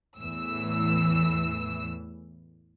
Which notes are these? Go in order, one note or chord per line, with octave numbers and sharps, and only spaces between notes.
E2 A2 E3 E6